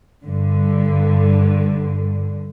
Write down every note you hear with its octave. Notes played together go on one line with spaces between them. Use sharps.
G2 D3